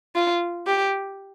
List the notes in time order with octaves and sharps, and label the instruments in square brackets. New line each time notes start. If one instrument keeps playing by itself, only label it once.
[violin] F4
G4